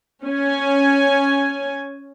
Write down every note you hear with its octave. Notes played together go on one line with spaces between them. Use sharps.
C#4 G#5